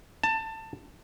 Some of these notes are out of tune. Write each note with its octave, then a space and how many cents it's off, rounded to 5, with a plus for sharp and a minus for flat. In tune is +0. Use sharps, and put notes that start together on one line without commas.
A5 +20